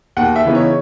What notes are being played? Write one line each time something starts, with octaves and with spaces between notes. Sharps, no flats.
D#2 F#5
E5
C#3 E3 B3 D#4
C#5